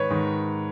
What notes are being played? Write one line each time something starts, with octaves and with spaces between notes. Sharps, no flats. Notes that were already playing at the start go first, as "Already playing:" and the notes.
Already playing: G#2 D#3 B4 C#5
G#2 D#3